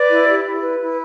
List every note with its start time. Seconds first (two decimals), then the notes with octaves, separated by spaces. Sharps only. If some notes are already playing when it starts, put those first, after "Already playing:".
Already playing: B4 D5
0.10 E4
0.27 G4
0.44 E4
0.61 B4
0.79 E4